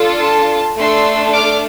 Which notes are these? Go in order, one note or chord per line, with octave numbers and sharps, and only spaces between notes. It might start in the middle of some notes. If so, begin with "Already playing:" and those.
Already playing: D4 F4 A4
A5 C6
A3 D4 A4 C6 E6
D6 F6